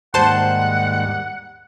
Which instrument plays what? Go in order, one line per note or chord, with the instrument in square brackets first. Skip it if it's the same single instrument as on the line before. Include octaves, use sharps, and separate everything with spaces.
[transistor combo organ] D#2 G#2 G3 [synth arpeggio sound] C5 A5 C6 [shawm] F#5